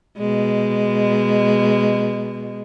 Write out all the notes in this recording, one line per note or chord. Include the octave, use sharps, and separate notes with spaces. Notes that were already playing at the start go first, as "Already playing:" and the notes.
B2 G#3